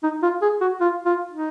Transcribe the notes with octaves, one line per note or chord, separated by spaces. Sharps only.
D#4
F4
G#4
F#4
F4
F4
D#4